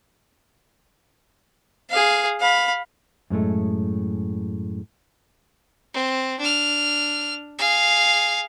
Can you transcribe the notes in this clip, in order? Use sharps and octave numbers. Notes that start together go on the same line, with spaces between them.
G#4 F5
F5 B5
F#2 A2 G#3 A3
C4
D4 F6
G#4 F5